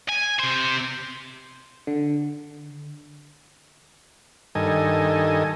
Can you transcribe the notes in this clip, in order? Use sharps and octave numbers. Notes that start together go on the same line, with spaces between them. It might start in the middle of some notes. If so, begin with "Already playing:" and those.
G#5
C3 C5
D3
G2 D#3 A4 D#5 G#5